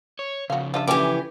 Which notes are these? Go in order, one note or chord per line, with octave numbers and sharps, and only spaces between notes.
C#5
C#3 F3 F#4 F5
G3 D4 F4 E5
D3 E3 C#4 G4 G5 G#5 D6